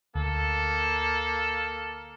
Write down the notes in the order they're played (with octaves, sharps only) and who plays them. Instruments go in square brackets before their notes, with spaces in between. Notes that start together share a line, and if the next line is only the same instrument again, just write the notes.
[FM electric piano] D2 [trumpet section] A#3 A4